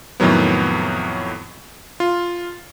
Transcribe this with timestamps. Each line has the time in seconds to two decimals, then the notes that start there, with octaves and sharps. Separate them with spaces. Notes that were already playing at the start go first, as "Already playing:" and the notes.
0.20 F2 A2 D#3 F#3 B3
2.00 F4